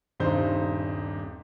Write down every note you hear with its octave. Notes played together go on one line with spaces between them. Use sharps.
D#1 G2 C3 D#4 C5 G6